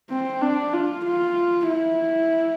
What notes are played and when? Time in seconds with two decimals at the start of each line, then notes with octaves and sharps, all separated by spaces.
0.10 C4
0.42 D4
0.74 F4
1.06 F4
1.69 E4